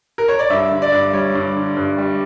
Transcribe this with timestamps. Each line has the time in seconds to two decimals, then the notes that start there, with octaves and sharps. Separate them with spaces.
0.18 A#4
0.28 C#5
0.39 D5
0.50 G2 E5
0.71 D3
0.82 D5
0.92 G2
1.13 G3 C#5
1.34 G2
1.56 D3
1.77 G2
1.98 G3